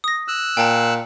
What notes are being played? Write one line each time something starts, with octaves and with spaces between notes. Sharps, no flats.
D#6 A#6
E6 F#6
A#2 G5 A5